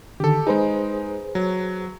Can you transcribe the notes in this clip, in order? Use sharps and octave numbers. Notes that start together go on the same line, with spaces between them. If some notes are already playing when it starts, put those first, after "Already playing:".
D3 D#3 G4 A4
G#3 D#4 G#4 B4 C5
F#3